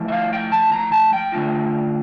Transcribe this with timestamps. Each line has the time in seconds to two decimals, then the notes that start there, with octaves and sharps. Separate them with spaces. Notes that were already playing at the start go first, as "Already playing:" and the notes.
Already playing: F3 A3 E4
0.08 E5
0.12 F5
0.33 G5
0.52 A5
0.72 A#5
0.92 A5
1.13 G5
1.32 D3 A3 D4 F4